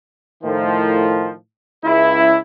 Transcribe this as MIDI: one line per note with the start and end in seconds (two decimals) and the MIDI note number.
0.43 1.33 45
0.43 1.33 51
0.43 1.33 53
1.84 2.36 37
1.84 2.36 64